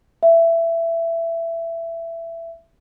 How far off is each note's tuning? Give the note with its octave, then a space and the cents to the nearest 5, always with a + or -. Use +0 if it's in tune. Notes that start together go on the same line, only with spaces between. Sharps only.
E5 +15